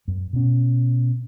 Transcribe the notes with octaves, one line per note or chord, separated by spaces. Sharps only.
F#2
B2 C#4